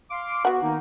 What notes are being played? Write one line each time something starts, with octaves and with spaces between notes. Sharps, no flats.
F5 C6 D6
B3 F#4 F#5
D#3 A#3 D#4